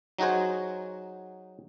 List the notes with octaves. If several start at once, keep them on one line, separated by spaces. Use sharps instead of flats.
F#3 D#4 F#4 G#4 C5